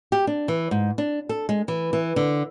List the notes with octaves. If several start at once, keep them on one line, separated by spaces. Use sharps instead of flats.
G4
D4
E3
G#2
D4
A4
G#3
E3
E3
D3